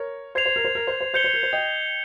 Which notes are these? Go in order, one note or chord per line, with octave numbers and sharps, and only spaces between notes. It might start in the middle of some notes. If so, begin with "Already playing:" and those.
Already playing: A#4 C#5
C5 G#6 C7 F7
C5
A#4
C5
A#4
C5
C5
C5 G6 C#7 G7
C5
A#4
C5
D#5 G5